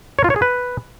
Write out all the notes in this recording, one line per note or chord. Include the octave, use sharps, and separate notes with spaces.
C#5
F4
C#5
G#4
B4